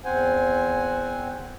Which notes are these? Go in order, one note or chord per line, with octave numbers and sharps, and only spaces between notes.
E2 C4 C5 F#5 G#5